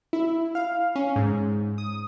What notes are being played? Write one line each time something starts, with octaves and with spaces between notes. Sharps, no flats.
E4
F5
C#4
G#2
D#6